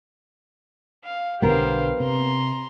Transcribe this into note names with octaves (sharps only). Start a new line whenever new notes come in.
F5
B1 D3 B3 G4 A#4 C5 F5
C3 A#5 C6